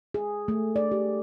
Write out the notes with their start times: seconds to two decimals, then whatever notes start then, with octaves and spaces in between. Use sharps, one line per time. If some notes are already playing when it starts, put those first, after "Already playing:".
0.14 G#4
0.48 A3
0.76 D5
0.92 G4